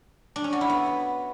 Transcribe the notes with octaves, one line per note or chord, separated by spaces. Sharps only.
D4
C#4
F#4
E4
B3